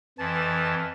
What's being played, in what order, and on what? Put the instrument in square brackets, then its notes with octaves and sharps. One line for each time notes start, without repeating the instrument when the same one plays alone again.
[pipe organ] F2 E3 [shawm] A5